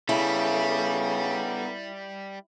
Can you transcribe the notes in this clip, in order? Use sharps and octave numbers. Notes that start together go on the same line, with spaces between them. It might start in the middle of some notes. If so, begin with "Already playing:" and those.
C#3 G3 B3 E4 A4